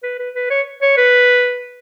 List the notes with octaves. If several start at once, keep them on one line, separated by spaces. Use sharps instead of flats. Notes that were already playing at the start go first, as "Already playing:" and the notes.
B4
B4
B4
C#5
C#5
B4